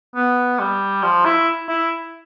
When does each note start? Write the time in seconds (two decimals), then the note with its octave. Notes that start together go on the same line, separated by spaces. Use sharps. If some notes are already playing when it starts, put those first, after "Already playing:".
0.15 B3
0.59 G3
1.03 F3
1.25 E4
1.68 E4